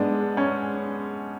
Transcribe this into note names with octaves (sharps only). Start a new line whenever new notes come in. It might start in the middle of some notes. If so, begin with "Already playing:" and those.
Already playing: G#2 G#3 B3 D4
C#4